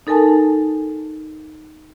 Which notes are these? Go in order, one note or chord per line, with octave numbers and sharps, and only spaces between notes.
D#4 A4 A#4 G#5 A5